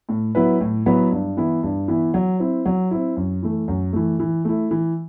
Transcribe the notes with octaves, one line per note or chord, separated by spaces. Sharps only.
A2
F#3 B3 E4 B4
A2
F#3 B3 E4 B4
G2
E3 B3 E4
G2
E3 B3 E4
F#3
C4 E4
F#3
C4 E4
F#2
E3 A3
F#2
E3 A3
E3
A3 E4
E3